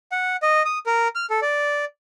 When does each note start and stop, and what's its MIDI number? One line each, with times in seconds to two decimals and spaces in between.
0.12 0.36 78
0.42 0.63 75
0.65 0.79 87
0.86 1.08 70
1.15 1.26 89
1.30 1.40 69
1.42 1.85 74